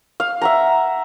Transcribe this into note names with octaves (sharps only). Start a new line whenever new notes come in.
F5
E5 F#5 A#5